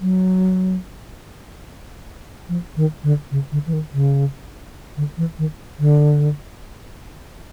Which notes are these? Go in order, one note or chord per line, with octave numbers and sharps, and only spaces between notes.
F#3
F3
D#3
D3
C#3
D3
E3
D#3
C#3
D3
E3
D#3
D3